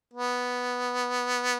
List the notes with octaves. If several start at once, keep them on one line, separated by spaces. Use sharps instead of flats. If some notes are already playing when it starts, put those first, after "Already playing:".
B3